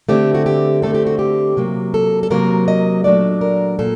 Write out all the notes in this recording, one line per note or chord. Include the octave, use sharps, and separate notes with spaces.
D3 A3 C4 G4
F#4
G4
D3 A3 C4 A4
G4
F#4
G4
C3 F#3 A#3
A4
A4
C3 F#3 A#3 A#4
D#5
A#2 F#3 A3 D4 D5
A#4
A#2 A4